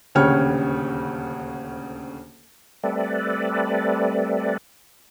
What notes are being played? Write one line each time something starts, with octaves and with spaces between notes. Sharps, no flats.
D#1 D2 C#3 C#5 G5 F6
G3 A3 C4 A4 B4 D5